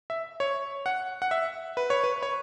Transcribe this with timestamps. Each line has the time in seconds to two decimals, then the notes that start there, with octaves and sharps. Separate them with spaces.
0.10 E5
0.40 C#5
0.86 F#5
1.22 F#5
1.31 E5
1.77 B4
1.90 C#5
2.04 B4
2.23 C#5